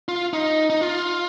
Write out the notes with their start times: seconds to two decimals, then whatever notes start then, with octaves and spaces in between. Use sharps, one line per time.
0.08 F4
0.33 D#4
0.70 D#4
0.81 F4